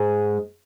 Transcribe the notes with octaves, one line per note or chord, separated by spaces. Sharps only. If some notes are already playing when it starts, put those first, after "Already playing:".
Already playing: G#2 G#3